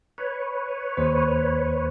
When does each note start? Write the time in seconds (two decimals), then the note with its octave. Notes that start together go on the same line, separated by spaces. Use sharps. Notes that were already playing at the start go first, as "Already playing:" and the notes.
0.18 B4 C#5
0.97 D#2 C5